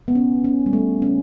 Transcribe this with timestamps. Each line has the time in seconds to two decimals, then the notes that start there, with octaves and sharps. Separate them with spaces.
0.08 B3
0.15 C#4
0.44 C#4
0.66 G3
0.73 A3
1.02 C#4